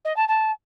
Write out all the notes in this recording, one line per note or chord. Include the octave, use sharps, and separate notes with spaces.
D#5
A5
A5